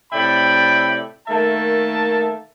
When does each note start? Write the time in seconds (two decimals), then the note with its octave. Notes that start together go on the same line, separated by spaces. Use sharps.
0.13 A2 C3 D5 E5 G5 B5
1.28 D#3 A3 A#3 E5 A5